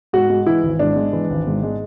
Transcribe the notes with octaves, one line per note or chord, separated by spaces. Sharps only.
G#2 F#4
G#3
E3 E4
G#1
G#2 D4
G#3
E3
G#1
G#2
G#3